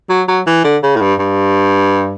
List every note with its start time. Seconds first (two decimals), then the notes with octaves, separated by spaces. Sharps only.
0.10 F#3
0.28 F#3
0.46 E3
0.64 D3
0.83 C#3
0.96 A2
1.01 G2
1.19 G2